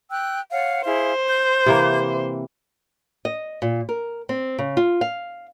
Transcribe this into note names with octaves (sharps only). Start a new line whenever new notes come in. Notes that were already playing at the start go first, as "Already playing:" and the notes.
G5 E6 F#6
C#5 F5 F#5
E4 G#4 C5 F5
G6
C3 E3 A#3
D#5
A#2
A#4
C4
C#3
F4
F5